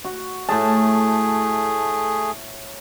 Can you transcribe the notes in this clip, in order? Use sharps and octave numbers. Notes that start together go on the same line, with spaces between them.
F#4
A2 A3 G#4 A5